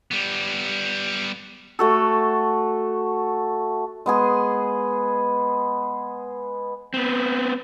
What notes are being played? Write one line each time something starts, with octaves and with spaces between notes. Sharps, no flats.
G3 B3
A3 F#4 A4
G#3 B3 G#4
B3 C4